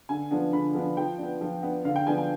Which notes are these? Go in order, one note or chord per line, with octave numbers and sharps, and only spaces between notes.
D3 G#5
F3 B3 D4
D3 B5
F3 B3 D4
F3 G5
B3 D4
F3
B3 D4
D3 F5
G5
F3 B3 D4 G#5
G#5